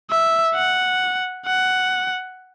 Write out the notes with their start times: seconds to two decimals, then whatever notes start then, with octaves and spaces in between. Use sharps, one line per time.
0.10 E5
0.55 F#5
1.46 F#5